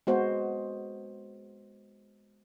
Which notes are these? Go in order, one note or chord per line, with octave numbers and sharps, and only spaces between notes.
G#3 B3 F#4 C5